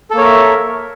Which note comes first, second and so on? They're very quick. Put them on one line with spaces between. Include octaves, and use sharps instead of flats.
A4 A#3 C#5 A#4 E5